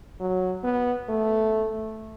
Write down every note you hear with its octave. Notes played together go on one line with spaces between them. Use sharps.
F#3
B3
A3